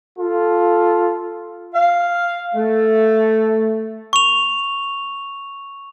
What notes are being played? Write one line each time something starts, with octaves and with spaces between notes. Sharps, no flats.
F4 A4
F5
A3
C#6 F7